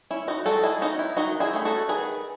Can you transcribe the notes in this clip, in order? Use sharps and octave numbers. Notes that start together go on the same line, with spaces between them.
C#4 E4
D#4 F#4
G#3 F#4 A4
E4 G#4
C#4 D#4 F#4
E4
D#3 D#4 F#4
E4 G#4
A3 C#4 G#4
F#4 A4
D#3 G#4 B4